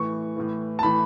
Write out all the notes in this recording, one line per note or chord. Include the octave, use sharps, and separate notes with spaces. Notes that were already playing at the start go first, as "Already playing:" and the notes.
Already playing: A2 E3 C#6
A2 E3
A5
A2 E3 B5